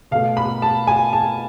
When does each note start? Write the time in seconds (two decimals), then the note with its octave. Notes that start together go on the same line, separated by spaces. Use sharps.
0.11 B2 F5
0.15 A3
0.37 B5
0.62 A5
0.87 G#5
1.13 A5